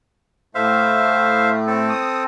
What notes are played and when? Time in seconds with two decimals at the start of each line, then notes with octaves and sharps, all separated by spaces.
0.55 A2 A3 C5 E5 F5
1.67 C4 A4
1.90 D#6